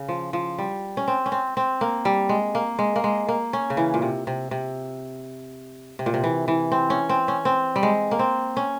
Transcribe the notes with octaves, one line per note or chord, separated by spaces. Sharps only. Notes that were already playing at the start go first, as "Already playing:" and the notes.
Already playing: C#3
F3
F3
G3
C#4
C4
C#4
C4
C4
A#3
G3
G#3
A#3
G#3
A#3
G#3
A#3
C#4
C#3
E3
A#2
C3
C3
C3
C3
A#2
C3
E3
E3
C4
C#4
C4
C#4
C4
G3
G#3
A#3
C4
C#4